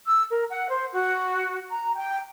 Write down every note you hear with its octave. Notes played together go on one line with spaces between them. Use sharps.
E6
A#4
F#5
C5
F#4
A#5
G5